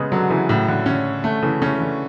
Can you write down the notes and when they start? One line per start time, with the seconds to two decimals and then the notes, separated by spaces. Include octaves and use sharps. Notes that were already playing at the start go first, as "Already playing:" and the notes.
Already playing: C#3 G#3 B3 C#4
0.12 D3 F#3
0.30 C#3 E3
0.49 A2 C#3
0.68 D3
0.86 C#3 C#4
1.24 D3 A3
1.42 C#3 E3
1.61 C#3 E3 C#4
1.80 D3